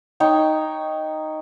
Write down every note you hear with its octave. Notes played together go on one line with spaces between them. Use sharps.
D#4 C#5 G5